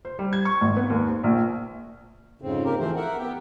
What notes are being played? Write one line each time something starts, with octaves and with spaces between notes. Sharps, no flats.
C5
G3
G#6
C#6
G#1
B3
D#2
C5
A#1
F2 G#2 C#3 C4
A#3 G4 A#4
E3 F3 A3 C4 C5
A#4 E5 F#5
B3 G4 G5